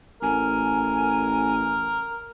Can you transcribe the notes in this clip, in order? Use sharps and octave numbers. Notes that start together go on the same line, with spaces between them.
A1 A#4 G#5